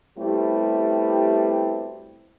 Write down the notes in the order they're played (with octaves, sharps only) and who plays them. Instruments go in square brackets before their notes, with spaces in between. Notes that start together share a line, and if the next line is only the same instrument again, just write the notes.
[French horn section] B2 G3 A3 C4 E4 G4